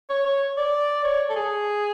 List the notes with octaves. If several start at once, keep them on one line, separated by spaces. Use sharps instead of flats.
C#5
C#5
D5
C#5
A4
G#4